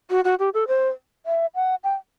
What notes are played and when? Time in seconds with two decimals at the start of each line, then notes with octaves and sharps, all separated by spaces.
0.10 F#4
0.24 F#4
0.39 G4
0.54 A4
0.68 C5
1.26 E5
1.55 F#5
1.84 G5